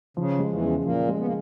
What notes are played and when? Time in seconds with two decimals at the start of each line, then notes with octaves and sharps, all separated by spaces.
0.17 C#3 F3
0.39 G#3
0.51 E2 E3
0.62 C#3
0.84 A#2 F3 A#3
1.09 G#3
1.19 B3
1.26 A#3